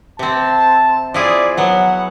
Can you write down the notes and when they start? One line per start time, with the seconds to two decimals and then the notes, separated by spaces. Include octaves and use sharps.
0.19 C3 C4 A5
1.14 F3 E4 G#4 D5
1.57 F#3 B3 F#5